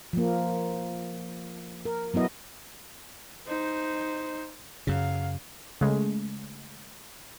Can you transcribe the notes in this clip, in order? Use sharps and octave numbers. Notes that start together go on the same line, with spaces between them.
F3 A#3
A#4
F#3 B3 E4 D#5
D#4 C5
F#2 C#3 F#3 F5
C#3 G#3 A3